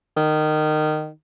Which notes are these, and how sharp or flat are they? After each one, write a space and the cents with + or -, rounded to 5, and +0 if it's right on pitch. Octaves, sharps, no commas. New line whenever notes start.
D#3 -20